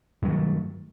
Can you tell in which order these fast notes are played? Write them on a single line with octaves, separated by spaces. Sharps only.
G2 F#3 D#3 A3